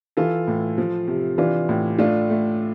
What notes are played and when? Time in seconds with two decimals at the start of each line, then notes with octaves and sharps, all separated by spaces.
0.17 E3 F4 A4
0.48 A2
0.78 F3
1.08 C3
1.38 E3 D4 F4
1.69 A2
1.99 A3 D4 F4
2.30 A3